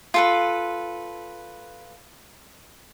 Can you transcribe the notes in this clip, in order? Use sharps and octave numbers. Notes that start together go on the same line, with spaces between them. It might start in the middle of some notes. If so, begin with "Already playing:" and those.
F4 A4 B4